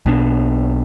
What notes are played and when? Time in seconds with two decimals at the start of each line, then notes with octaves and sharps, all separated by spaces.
0.06 B1 B2 B3 D4